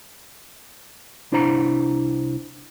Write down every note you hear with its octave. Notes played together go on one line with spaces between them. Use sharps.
C2 D4 E4 C5 A#5